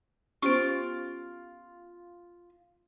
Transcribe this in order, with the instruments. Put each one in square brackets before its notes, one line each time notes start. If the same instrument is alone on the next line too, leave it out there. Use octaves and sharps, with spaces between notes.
[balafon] B3 G4 [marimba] C#4 C5 [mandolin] F4 [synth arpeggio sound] C#6 D7